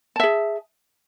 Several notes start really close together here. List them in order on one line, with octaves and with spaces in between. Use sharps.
A5 E5 G#4